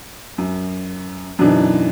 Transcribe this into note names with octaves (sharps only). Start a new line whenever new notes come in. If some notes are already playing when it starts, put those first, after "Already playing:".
F#2
F#2 B2 D3 E3 D4 D#4